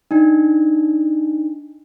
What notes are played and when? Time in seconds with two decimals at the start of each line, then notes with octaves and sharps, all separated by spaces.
0.11 D4 D#4